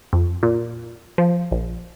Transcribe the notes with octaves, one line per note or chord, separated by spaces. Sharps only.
F2
A#2
F3
A#1